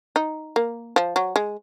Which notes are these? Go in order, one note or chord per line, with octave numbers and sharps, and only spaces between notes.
D#4
A#3
F3
F#3
G#3